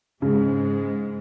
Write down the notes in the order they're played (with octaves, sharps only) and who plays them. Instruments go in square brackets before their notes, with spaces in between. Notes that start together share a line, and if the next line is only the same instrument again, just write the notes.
[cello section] G#2 G#3 [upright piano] C#3